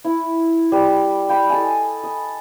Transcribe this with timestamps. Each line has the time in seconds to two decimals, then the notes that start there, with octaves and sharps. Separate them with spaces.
0.05 E4
0.72 G3
1.29 G5 B5
1.50 A4 D#5 G#5
2.04 D#5